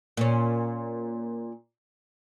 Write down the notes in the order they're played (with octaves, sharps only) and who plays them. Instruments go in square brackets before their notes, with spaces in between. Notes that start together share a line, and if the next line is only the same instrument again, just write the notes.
[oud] A#2 C#4